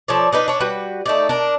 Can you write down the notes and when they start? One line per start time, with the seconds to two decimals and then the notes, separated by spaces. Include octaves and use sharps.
0.08 F3 A4 C#5 D5
0.32 D4 D#4 B4
0.48 D4 C#5
0.60 G3 F#4 B4
1.06 A3 D#4 D5
1.29 D4 A#4